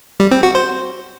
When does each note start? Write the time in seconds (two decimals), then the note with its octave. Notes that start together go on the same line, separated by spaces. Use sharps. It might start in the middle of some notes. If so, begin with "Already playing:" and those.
0.20 G3
0.31 C4
0.43 F#4
0.55 C5